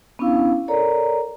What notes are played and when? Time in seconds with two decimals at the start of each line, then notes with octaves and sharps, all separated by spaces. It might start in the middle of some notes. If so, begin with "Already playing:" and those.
0.19 B3 C#4 D4 E4 F5
0.68 A4 A#4 C#5 D5 A#5